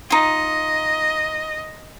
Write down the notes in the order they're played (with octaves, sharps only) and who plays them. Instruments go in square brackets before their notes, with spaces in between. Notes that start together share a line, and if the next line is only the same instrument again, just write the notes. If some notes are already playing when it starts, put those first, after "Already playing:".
[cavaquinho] D#4 F4 [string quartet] D#5